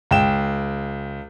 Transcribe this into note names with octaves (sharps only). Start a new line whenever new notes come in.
C#2 G5 E7